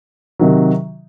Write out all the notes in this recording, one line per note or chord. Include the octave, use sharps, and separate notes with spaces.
C3 D#3 F#3